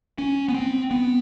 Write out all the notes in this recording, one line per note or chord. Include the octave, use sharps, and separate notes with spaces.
C#4
B3
C4
B3